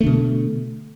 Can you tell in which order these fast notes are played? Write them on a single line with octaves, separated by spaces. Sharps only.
A3 D3 B2